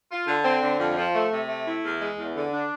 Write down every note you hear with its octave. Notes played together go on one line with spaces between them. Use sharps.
F4
D3
C4
D3
F2
F3
A3
C3
A3
E4
E2
G#3
E2
D3
D4